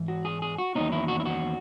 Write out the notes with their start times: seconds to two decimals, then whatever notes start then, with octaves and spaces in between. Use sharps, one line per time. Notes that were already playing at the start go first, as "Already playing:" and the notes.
Already playing: G#2 E3
0.08 F#4
0.25 G#4
0.42 G#4
0.58 F#4
0.75 E2 D#3 F#3 A#3 C#4 D#4
0.92 E4
1.08 F#4
1.20 E4
1.25 F#4